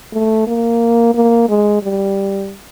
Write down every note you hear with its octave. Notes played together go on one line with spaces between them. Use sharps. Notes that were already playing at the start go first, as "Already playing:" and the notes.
A3
A#3
A#3
G#3
G3